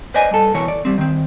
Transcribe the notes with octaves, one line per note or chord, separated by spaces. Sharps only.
B4 C5 D5 D#5 G#5
G2 A4
B2 E3 A#4 C#5
D5
G3 C4
D#3 C4